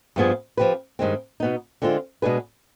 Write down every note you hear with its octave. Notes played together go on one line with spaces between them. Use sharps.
G2 F3 B3 F4 G#4
F3 C4 G4 B4
G2 D#3 G#3 C4
B2 B3 D#4
D3 G#3 C4 F4
B2 G#3 D4 G#4 B4